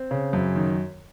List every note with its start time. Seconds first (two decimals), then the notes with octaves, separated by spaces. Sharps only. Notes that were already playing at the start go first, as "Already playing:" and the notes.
Already playing: C4
0.11 C#3
0.33 F#2
0.55 D#3